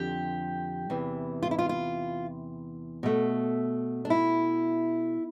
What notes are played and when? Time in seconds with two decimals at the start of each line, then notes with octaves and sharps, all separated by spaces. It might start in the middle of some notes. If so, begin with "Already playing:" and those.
Already playing: F2 D3 F3 G4
0.90 E2 C3 E3
1.43 F4
1.51 E4
1.59 F4
1.69 F4
3.03 B2 A3
4.05 D4
4.10 E4